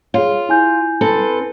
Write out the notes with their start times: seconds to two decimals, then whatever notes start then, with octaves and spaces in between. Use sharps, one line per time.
0.14 F4 G#4 C#5
0.49 E4 G#5 G6
1.01 C4 A4 B4